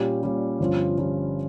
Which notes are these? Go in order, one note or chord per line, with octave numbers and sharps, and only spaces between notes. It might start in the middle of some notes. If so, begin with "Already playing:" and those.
Already playing: A#2 G3 C#4 G4
A#2 G3 C#4 G4
G1 G2 F3 C#4 F4
G1 G2 F3 C#4 F4